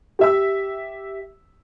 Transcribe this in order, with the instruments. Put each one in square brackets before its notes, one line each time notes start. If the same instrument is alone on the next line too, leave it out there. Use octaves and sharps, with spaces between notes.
[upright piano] G4 E5 E6